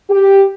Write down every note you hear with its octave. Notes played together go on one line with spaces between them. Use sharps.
G4